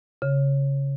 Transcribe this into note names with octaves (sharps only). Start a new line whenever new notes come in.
C#3